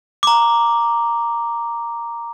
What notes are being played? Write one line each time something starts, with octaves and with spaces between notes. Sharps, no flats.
A#5 D6